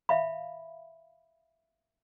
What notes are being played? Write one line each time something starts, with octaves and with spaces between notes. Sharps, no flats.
E5 F5 B5